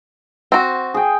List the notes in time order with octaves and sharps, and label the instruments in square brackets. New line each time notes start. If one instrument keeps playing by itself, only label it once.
[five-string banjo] C4 F#4
[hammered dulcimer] G#4 G5